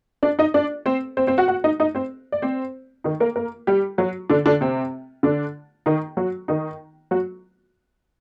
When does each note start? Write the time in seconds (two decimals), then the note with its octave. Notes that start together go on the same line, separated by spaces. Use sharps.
0.23 D4 D5
0.39 D#4 D#5
0.54 D4 D5
0.86 C4 C5
1.17 C4 C5
1.27 C4 C5
1.38 F#4 F#5
1.48 F#4 F#5
1.64 D#4 D#5
1.80 D#4 D#5
1.95 C4 C5
2.32 D5
2.42 C4 C5
3.04 D#3 D#4
3.20 A#3 A#4
3.36 A#3 A#4
3.67 G3 G4
3.98 F#3 F#4
4.30 D3 D4
4.46 D3 D4
4.61 C3 C4
5.23 D3 D4
5.86 D#3 D#4
6.17 F#3 F#4
6.48 D#3 D#4
7.11 F#3 F#4